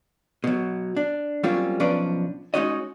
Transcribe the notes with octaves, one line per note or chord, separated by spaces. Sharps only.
B2 F#3
D4
F#3 G3 A#3 C4 C#4 F4
B1 F3 C#4 D4 B4 D5
G#3 C#4 D#4 F#4 C#5 D#5